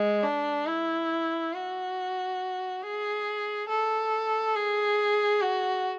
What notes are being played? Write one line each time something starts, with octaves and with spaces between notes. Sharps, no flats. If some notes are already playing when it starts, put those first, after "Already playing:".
Already playing: G#3
D4
E4
F#4
G#4
A4
G#4
F#4